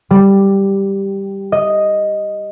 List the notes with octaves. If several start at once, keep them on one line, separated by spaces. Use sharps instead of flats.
G3
D#5